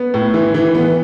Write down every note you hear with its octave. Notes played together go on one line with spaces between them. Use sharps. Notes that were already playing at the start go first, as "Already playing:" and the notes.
Already playing: B3
A2
E3
E3
B3